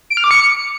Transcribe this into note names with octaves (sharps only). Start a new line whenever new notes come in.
D7
F6
D6
C#7